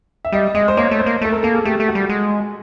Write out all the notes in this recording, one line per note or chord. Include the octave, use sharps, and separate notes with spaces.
E5
G3 D#5
G#3 D#5
C5
A#3 C#5
A3
C5
A#3
A3 A4
A#4
A#3 A4
G#4
A3 G4
A3
F#4
G3
G#3